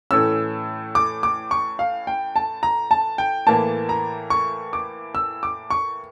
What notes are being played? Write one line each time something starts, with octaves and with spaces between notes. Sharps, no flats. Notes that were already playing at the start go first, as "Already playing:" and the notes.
A2 E3 A3 C#4 E6
D6
D6
C#6
F5
G5
A5
A#5
A5
G5
A2 E3 A#3 A5
A#5
C#6
D6
E6
D6
C#6